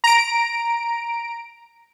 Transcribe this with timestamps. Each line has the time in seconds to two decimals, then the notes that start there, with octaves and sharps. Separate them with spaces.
0.04 A#5 D7